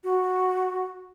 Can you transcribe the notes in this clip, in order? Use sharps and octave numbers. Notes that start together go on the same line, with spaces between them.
F#4